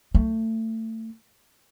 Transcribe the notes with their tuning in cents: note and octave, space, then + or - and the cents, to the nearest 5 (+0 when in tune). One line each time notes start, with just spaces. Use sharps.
A3 +25